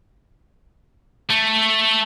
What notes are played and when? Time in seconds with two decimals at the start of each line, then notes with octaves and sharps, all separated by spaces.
1.30 A3